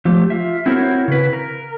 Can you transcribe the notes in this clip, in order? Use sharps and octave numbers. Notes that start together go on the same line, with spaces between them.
F3 A3 G4
F4 E5
C4 E4 F#4 A#4 C#5
C#3 B4
A#4